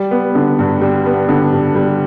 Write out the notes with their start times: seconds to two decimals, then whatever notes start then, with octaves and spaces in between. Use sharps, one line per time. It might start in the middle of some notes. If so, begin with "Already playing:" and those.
Already playing: G3
0.11 B3
0.35 D3
0.59 G2
0.82 G3
1.06 B3
1.29 D3
1.53 G2
1.75 G3